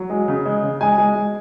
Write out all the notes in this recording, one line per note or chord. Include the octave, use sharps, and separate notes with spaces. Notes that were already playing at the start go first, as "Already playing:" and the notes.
Already playing: F#3
G#3
C#3
G#3
C#3
G#3 G#5
G#3
G#3